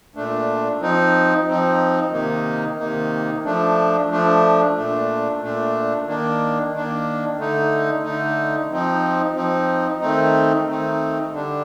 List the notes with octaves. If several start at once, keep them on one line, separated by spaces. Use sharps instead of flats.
A#2 A3 D4
F3 C4 D#4
F3 C4 D#4
C3 D#3 A#3 D#4
C3 D#3 A#3 D#4
F3 A3 D4
F3 A3 D4
A#2 A3 D4
A#2 A3 D4
D#3 A#3 D4
D#3 A#3 D4
D3 A3 D#4
D3 A3 D#4
F3 C4 D#4
F3 C4 D#4
D#3 A3 C4 D#4
D#3 A3 C4 D#4
D3 G3 D4